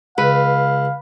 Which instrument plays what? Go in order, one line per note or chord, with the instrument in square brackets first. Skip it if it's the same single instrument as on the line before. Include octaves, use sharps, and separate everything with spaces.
[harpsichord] C#2 [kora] B4 [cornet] F5